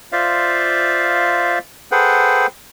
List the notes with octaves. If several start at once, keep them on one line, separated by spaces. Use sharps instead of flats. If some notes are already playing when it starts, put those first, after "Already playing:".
F4 C5 D5 E5 F5
G#4 A4 B4 C5 F#5 G5